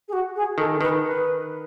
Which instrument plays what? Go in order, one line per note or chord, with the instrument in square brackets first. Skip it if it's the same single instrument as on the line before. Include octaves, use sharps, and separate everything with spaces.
[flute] G#4
F#4
G#4
[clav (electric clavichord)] D#3 [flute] A4
[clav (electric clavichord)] D#3 [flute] B4
[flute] B4